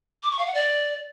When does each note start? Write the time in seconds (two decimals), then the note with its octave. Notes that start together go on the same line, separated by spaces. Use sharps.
0.23 D6
0.31 C#6
0.39 F5
0.47 F#5
0.54 D5